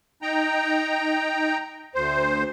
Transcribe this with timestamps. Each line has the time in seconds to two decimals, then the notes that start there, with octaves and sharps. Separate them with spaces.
0.22 D#4 G5 A#5
1.95 D2 C5